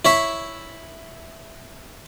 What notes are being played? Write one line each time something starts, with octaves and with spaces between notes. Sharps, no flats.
E4 C#5 E5